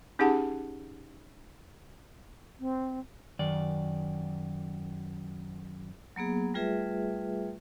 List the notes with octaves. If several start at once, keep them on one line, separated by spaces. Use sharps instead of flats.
C#4 D#4 G4 G#4 F#5 A5
C4
F#2 D#3 D5
F#3 A#3 B3 G#4
G3 A3 F4 G#4 B4 E5